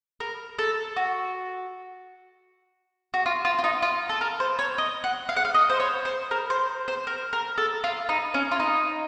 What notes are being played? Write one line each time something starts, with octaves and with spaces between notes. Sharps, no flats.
A#4
A4
F#4
F#4
F4
F4
F4
D#4
F4
A4
A#4
C5
C#5
D#5
F#5
F5
F#5
F5
D#5
C5
C#5
C5
A#4
C5
C5
A#4
A#4
A4
F4
D#4
C#4
F4
D#4